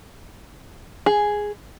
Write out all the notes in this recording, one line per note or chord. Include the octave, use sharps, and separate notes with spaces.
G#4